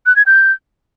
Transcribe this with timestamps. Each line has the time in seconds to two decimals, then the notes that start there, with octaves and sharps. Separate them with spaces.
0.06 F#6
0.16 G#6
0.26 G6